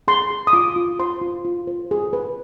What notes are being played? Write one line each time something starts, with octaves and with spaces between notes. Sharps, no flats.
G#4 C6
G#4
D#6
F4 D6
F4
C5 C6
F4
F4
C5
G#4
B4